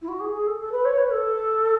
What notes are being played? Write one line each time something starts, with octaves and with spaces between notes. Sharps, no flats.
E4
F#4
G#4
G#4
A4
A4
B4
C#5
B4
A4